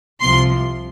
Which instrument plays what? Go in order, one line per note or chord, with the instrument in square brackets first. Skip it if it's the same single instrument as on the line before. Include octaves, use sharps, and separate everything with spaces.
[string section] C2 C3 F3 C6